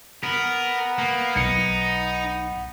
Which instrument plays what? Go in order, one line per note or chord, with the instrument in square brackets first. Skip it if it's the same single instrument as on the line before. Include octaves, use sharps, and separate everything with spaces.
[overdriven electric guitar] B3 [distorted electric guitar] A#4
[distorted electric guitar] A#3
[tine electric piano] B1 C#7 [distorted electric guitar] D#4